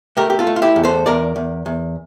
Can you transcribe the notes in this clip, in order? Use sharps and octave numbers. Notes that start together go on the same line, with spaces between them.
A3 G4 A#4
G4
F4 A4
A3
F4
E4 G4
E2
A4 C5
E2 A#4 D5
E2
E2